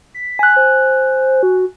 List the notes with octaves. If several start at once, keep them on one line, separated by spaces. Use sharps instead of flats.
B6
G#5 F#6
C5
F#4